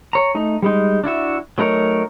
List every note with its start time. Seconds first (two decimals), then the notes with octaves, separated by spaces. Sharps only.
0.13 C#5 A#5
0.35 A3 D#4
0.62 G3 G#3 D#4
1.04 D4 E4 F#4 E5
1.58 F#3 A3 D#4 A#4 C#5